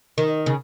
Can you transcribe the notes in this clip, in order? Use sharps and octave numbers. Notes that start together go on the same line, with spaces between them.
D#3
C#3